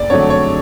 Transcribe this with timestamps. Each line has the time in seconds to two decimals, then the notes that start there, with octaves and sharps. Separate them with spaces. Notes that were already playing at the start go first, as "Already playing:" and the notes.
Already playing: F#1 D5
0.10 F2 D3 F#3 A3 C#5
0.30 C#5